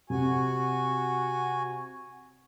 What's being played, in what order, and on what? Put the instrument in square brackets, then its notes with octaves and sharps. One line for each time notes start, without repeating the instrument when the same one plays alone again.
[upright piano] C3 [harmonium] F#4 G#5